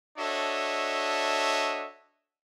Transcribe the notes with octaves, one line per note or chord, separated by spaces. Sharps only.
D4 F#4 A4 C#5 D#5 E5